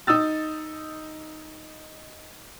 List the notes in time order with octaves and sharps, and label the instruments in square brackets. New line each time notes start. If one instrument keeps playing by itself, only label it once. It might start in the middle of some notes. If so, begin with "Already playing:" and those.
[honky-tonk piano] D#4 D#6 E6 A6